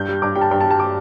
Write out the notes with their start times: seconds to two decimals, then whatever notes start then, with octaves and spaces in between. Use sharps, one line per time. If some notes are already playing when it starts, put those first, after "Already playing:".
Already playing: G2 G6
0.09 G3
0.22 G2 D6
0.36 G3 G5
0.41 A5
0.51 G2 G5
0.61 A5
0.65 G3
0.71 A5
0.80 D6